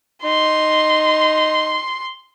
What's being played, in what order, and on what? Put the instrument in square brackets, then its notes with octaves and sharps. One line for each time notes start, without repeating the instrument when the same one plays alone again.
[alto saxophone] D#4 [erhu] C6